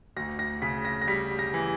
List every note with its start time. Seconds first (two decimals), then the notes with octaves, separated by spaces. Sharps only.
0.16 D2 A#6
0.39 A#6
0.62 C#3 B6
0.85 A#6
1.02 A#6
1.07 G3 B6
1.39 A#6
1.54 E3